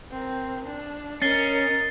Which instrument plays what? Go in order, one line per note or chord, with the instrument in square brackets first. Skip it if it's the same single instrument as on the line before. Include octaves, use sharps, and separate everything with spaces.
[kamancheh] C4 A#4
D4
[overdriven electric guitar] C#4 [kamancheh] A#4 D#5 [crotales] A6 C7 G7